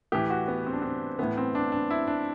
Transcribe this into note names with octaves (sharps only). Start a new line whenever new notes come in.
A2 E3 G4
F#4
B3
C4
D4
C4
A2 E3 B3
C4
D4
D4
E4
D4